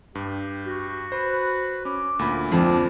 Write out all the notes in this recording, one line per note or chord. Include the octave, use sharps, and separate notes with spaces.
G2 G4
F#4
B4 C5
C#4 D6
D2 A#2 B5
F2 F3 D5